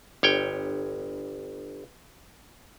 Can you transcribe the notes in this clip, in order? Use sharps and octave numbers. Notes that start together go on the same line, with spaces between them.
G1 C#5 G5